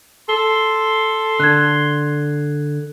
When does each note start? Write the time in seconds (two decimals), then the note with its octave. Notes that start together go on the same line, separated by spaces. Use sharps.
0.29 A4 C6 G7
1.40 D3 F#6 G#6